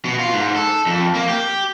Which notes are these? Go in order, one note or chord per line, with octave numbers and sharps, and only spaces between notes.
B2
F4
G#2
A4
F2
A#3
G4